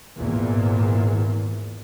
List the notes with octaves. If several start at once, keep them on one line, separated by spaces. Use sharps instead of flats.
G#1 E2 A#2